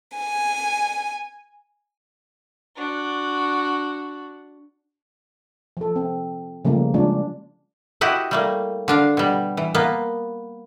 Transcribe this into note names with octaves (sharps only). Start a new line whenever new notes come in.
G#5
D4 F#4
F3 A4
C4
C#3 F3 G3 A3 A#3 C#4
F3 G#3 C#4 D4 F4
E4 F#4 G4 D#5
G3 A3 A#3
D3 D4 F5
B2 G3
E3
A#3 B3